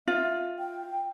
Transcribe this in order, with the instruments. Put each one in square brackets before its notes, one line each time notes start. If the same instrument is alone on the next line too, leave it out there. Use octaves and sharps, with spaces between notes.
[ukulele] F4 [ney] E5
[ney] G5